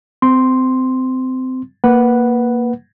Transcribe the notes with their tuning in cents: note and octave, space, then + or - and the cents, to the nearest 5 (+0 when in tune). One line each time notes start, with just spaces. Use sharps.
C4 -25 C6 +0
A#3 +0 B4 -5 F#5 +0